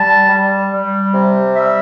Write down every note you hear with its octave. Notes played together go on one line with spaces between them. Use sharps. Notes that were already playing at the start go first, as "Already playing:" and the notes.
Already playing: G3 A5
G3
G3
C3
G3 E5